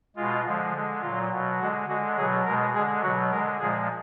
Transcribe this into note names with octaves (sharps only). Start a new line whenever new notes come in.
B2 G#3 F4
D3 F3 G#3
D3 G#3
A#2 F#3 F4
B2 F#3
D3 G#3 F#4
D3 G#3 F#4
B2 F#3 G#4
B2 G#3 A#4
D3 G#3 G#4
B2 F#3 F#4
D3 G#3 A#4
A#2 F3 G#3 G#4